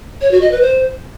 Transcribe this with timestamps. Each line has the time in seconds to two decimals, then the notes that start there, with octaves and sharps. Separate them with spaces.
0.21 C#5
0.31 F#4
0.41 D#5
0.51 B4
0.61 C5